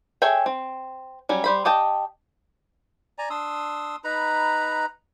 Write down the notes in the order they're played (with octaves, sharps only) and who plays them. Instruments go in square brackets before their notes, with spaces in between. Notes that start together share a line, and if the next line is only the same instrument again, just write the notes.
[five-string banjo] G#4 A4 C#5 E5 G5
C4
F#3 G3 C#4
G3 C5 B5
G4 D#5 G5 A5
[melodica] D5 G#5 A#5
D4 C6 D#6 E6
D#4 B4 A#5 B5